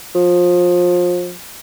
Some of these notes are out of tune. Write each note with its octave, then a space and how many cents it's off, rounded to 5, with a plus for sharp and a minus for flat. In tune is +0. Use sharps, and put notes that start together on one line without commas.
F3 +25